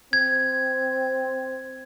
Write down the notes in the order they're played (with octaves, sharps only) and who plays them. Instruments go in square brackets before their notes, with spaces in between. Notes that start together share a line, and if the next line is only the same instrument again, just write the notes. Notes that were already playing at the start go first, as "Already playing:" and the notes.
[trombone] C4 [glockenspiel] G#6